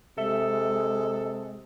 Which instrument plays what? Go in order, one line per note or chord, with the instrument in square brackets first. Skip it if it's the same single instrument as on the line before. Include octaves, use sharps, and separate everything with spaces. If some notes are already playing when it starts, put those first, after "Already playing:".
[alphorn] C3 [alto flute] G#3 [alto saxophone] A4 [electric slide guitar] E5